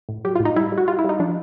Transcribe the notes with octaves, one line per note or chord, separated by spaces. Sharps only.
A2
F#3 G4
F4
A2
D#4
G3 E4
G3
F#4
G3 F4
E4
G3 D#4
F3 D4